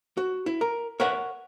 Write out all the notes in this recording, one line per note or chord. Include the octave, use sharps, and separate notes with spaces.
F#4
E4
A#4
A#4 B4 C#5 E5 F#5